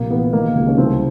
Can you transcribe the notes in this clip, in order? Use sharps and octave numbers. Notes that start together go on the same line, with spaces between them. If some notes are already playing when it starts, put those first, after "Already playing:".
Already playing: A#1 C3 A#3
E3 B3
D#3 A#3
C#2
C#4
C2 C4